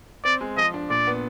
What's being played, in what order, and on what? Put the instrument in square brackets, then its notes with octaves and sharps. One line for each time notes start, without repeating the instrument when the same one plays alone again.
[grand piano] C4 [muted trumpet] D5
[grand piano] G#3
[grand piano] F3 [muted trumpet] D#5
[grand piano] D4
[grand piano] A#2 [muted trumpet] D5
[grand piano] B3